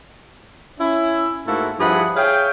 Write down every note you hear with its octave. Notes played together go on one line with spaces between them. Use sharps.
C#4 E4 E5
G#2 A3 A#3 E4 F#4 A4
G2 F3 E4 G#4 F#5 B5
G#4 C#5 E5 F5 G5